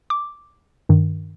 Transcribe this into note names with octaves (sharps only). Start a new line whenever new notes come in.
D6
G2 D#3